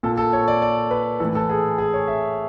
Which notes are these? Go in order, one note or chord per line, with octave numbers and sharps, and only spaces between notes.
A#2 A4
A4
C#5
D5
D5
B4
A2 E3 A4
A4
G#4
G#4
C#5
E5